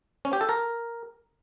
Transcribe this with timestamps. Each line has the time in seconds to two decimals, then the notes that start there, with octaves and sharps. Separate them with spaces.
0.25 C#4
0.33 G4
0.41 A4
0.49 A#4